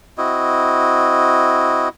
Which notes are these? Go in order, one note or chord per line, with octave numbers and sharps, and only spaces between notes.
C4 E4 F#4 D#5